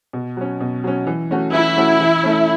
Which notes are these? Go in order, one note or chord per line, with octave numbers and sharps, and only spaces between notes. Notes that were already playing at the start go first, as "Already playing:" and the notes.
B2
F#3 C#4
B2
F#3 C#4
E3
A3 C#4 F#4
E3 E4
A3 C#4 F#4
E3
A3 C#4